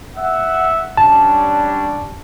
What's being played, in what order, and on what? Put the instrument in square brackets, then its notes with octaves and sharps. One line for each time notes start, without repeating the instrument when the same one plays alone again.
[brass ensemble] E5 F#5
[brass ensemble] G3 C#4 D4 [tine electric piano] A5